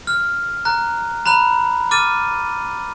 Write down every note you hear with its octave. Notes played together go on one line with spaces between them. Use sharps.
F6
A#5 F#6
A#5 B5 F#6 F7
D6 F6 A6 D#7